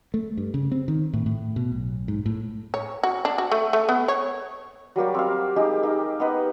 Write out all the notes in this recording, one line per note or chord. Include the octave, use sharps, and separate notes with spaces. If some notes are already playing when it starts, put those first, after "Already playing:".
A3
G2
C#3
C4
D#3
A2
A2
B2
B1
G#2
A2
C#5
F#4
D4
F#4
A3
A3
B3
C#5
F#3 G3 A#3 G4
C4 F5
G#3 D#4 G4
A#3 D#4
B3 D#4 B4